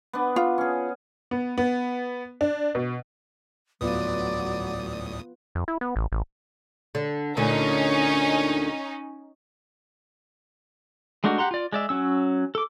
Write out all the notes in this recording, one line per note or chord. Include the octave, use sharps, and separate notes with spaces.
B3 D4
F4
C#4 G#4
B3
B3
D4
B2
D2 A2 F#3 B3 F4 B4 D5 D#6
F2
E4
B3
A1
A1
D3
D2 A#2 D3 C#4 D#4
G#3 A3 D4 D#4 F#4
G4 F#5 A#5 C6
F4 D5
G#3 D5 E5
F#3 C#4 E6
A4 D6